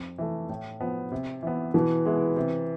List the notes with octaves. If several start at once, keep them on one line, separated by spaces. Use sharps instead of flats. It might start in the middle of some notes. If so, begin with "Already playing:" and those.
Already playing: F2
E3 A3
A2
F3 B3
C3
E3 B3
B2 E3
G#3 B3 E4
C3